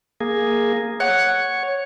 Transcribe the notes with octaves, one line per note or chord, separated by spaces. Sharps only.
A#3 G#4
C#5 F#5